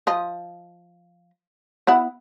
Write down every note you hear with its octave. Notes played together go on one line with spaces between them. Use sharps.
F3 D#5
B3 E4 F#5